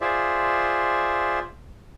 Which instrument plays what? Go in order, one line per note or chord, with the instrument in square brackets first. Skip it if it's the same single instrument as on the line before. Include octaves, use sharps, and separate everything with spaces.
[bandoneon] F4 G#4 C5 D5 E5